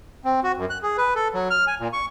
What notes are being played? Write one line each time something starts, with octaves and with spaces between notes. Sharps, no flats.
C4
F#4
F#2
F#6
G#4
B4
A4
F#3
F6
G#5
A#2
C#6